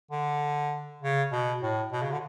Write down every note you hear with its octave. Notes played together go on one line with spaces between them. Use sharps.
D3
C#3
B2
A2
B2
C#3
D3